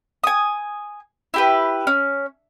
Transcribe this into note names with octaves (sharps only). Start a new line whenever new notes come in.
G#5 D#6
E4 G4 B4
C#4